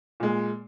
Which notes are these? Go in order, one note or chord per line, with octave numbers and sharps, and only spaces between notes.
A#2 G#3